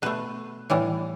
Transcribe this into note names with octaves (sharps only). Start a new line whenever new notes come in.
B2 A3 B4
A2 E3 G3